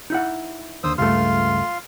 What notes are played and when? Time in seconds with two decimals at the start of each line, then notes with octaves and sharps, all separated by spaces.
0.10 D#4 E4 F#5
0.84 D#2 D3 C5 D#6 E6
0.98 C#2 G2 A3 F4 C6 F6